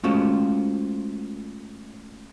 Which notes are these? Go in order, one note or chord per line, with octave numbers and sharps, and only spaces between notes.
G#3 A3 C#4 F4 F#4 C5